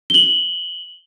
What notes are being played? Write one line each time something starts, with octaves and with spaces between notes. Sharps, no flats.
F#7 G7